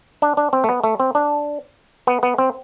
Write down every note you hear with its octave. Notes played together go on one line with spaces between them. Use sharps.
D4
D4
C4
A3
B3
A3
C4
D4
B3
B3
C4